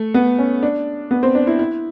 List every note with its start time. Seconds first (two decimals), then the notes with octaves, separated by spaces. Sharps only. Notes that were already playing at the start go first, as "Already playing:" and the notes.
Already playing: A3
0.14 B3
0.39 C#4
0.63 D4
1.11 B3
1.23 C4
1.35 D4
1.47 E4
1.59 E4